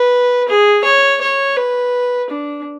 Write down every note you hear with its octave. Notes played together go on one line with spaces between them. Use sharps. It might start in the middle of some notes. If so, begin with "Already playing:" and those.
Already playing: B4
G#4
C#5
C#5
B4
D4